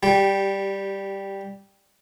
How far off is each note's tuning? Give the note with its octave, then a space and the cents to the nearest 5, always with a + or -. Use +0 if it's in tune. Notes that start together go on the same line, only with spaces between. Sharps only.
G3 +0 G4 -20 G5 +0